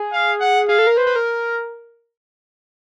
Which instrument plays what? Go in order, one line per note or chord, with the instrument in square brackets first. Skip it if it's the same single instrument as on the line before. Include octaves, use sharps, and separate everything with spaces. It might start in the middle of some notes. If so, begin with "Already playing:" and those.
Already playing: [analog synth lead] G#4
[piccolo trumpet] F5
F#5
[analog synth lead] G#4 [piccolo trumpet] F5
[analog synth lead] A4
A#4
[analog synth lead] B4 [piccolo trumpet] C5
[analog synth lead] B4
A#4